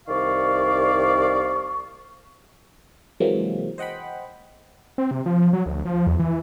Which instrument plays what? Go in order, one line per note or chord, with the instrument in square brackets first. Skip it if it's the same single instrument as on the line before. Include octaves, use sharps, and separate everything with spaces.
[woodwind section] C2 D#3 D5 F5 C#6
[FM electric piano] C3 E3 F#3 G#3 A#3 C4
C5 D#5 F#5 G5 B5
[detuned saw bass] C4
C3
F3
F#3
D2
F3
E2
E3